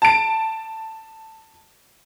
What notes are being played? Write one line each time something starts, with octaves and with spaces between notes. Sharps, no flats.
A5 D7